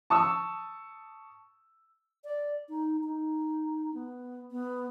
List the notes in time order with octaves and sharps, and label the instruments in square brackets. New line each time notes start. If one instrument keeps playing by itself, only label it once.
[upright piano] A5 C#6 D#6 E6
[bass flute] D5
D#4
D#4
B3
B3